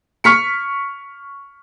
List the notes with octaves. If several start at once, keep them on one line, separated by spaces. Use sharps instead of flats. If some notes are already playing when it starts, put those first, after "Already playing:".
C#6 F6 B6 C#7